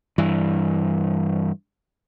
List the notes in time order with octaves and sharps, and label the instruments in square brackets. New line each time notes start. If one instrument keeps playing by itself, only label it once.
[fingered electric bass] G2 E3